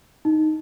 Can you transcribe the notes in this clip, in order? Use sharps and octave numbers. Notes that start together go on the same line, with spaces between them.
D#4